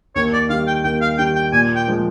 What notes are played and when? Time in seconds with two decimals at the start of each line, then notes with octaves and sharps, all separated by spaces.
0.16 D#2 C#5
0.33 D5
0.49 D#3 F5
0.53 G3
0.67 G5
0.84 D#2 G5
1.01 F5
1.18 D#3 G3 G5
1.36 G5
1.53 A#2 G#5
1.76 G5
1.88 F3 G#3